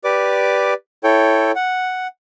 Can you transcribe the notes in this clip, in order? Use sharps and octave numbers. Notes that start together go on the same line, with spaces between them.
G4 B4 D5 D6
E4 A4 C#5 G5
F#5